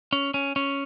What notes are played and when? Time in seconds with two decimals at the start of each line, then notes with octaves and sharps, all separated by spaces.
0.13 C#4
0.34 C#4
0.56 C#4